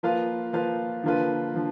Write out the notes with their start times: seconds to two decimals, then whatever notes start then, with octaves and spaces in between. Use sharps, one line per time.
0.03 F3 A#3 F4 B4 F5
0.53 F3 A#3 F4 B4 F5
1.04 D3 F3 A#3 F4 B4
1.54 D3 F3